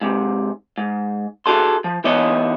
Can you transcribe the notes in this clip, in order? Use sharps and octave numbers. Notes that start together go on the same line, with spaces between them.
G#2 C3
G#2
F#4 G#4 A4 C6
F3
E3 B3 D#4 C#5 D#5